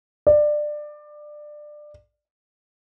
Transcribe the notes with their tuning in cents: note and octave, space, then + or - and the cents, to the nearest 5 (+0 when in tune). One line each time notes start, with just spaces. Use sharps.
D5 +20